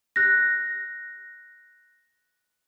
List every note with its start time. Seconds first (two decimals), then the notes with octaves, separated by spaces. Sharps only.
0.16 F#6 A#6